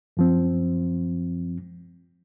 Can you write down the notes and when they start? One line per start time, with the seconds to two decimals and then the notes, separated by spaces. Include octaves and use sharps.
0.17 F#2 F3 C4